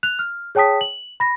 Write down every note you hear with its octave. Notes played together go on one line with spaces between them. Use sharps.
F#6 F7
F6
G#4 C#5 G5 A5 D#6 B6
F#7
B5 A#6